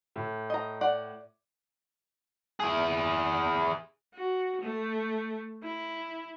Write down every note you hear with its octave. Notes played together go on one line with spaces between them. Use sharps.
A2
D#5 A#5
D5 F#5
E4 G#4
F#4
A3
E4